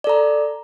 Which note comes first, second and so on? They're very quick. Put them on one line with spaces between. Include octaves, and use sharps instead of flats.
D5 A4 A#5